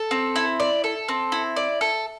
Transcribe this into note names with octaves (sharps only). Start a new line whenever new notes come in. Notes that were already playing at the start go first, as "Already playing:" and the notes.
Already playing: A4
C4
E4
D5
A4
C4
E4
D5
A4